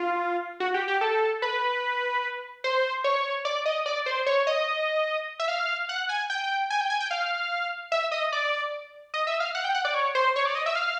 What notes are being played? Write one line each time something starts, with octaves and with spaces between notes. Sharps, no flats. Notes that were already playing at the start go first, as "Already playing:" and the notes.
Already playing: F4
F#4
G4
G4
A4
B4
C5
C#5
D5
D#5
D5
C5
C#5
D#5
E5
F5
F#5
G#5
G5
G#5
G5
G#5
G5
F5
E5
D#5
D5
D#5
E5
F5
F#5
G5
F#5
D5
C#5
C5
C#5
D5
D#5
E5
F5